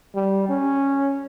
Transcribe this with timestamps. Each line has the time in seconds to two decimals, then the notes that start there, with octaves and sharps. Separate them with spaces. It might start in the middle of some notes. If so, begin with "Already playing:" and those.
0.15 G3
0.49 C#4